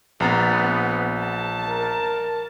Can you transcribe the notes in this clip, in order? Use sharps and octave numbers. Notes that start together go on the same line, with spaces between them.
A#1 B3 A#5 A6
A5
A#4